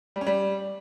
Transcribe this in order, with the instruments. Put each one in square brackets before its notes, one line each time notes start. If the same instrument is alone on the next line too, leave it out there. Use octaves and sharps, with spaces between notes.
[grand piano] G3
C#4
G3